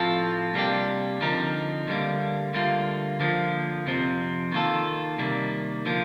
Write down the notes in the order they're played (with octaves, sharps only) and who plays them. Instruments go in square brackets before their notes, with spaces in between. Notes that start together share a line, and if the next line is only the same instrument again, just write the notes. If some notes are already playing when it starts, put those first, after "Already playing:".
Already playing: [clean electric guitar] A2 F3 C4 F4 A4
C3 G3 A#3 D4 G4
D3 F3 C4 D#4 A#4
D2 D3 G3 A#3
D2 D3 G3 A#3 F4
D3 F3 A#3
F2 C3 F3 C4
D#3 A#3 F4 A4
C3 D#3 G3 A#3
D3 F3 A#3